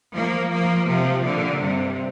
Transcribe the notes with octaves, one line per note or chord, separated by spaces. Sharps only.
F3 A#3
F3 A#3
C3 F3
A#2 D3
G2 C3